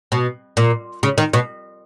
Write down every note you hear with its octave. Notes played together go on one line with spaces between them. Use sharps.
B2
A#2
C#3
D#3
B2